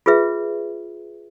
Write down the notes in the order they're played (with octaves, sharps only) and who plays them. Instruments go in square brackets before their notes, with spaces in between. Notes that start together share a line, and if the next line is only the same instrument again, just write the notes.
[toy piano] F4 G#4 B4 E5